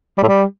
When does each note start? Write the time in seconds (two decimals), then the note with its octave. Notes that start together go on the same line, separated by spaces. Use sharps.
0.18 G3
0.23 A2
0.28 G3